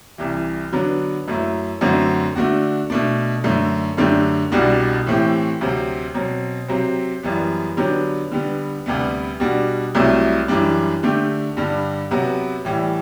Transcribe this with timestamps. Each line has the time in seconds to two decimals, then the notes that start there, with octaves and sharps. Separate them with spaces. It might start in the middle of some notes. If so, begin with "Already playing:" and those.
0.18 C2 C3 E3
0.73 D3 F#3 B3 D4
1.28 F#2 F#3 A3 E4
1.81 F#2 D3 A3 C4 F#4
2.35 D3 A3 D4 F#4
2.90 B2 A3 D4
3.44 F#2 D3 A3
3.97 F#2 D3 A3 D4 G4
4.52 C2 B2 G3 D4 F#4
5.07 A2 E3 A3 C4 G4
5.61 D2 C3 F#3 C4
6.14 B2 F#3 C4
6.68 C3 F#3 C4
7.23 F#2 E3 G3 B3
7.77 D3 F#3 B3 D4 G4
8.32 D3 G3 B3
8.86 D2 C3 G3 B3
9.40 B2 G3 D4 F#4
9.95 C2 C3 F#3 A3 E4
10.48 F#2 E3 G3 D4
11.03 D3 A3 D4 G4
11.57 G2 D3 G3
12.11 C3 F#3 B3 F#4
12.65 A2 E3 G3